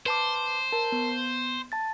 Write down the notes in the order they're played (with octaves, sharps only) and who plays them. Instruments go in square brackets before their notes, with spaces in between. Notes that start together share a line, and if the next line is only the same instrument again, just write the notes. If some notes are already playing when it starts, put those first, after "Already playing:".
[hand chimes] B4 A5 D6 [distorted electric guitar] C5
[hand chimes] A#4 A5
B3
A5 A6